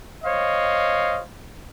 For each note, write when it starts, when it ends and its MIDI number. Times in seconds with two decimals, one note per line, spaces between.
0.24 1.22 72
0.24 1.22 73
0.24 1.22 75
0.24 1.22 77